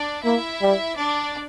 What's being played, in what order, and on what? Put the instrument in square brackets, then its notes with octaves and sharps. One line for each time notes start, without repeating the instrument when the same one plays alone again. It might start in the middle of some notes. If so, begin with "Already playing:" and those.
Already playing: [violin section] D4 D5
[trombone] A#3 [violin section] E4 E5
[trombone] G3
[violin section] D4 D5